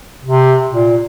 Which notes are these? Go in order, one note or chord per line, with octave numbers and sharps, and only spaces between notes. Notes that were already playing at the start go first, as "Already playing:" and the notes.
C3
A#2